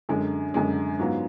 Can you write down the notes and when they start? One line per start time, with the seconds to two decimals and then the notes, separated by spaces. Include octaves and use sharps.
0.09 F#2 D3 G#3
0.54 F#2 D3 G#3
0.99 G#2 F#3 B3 F4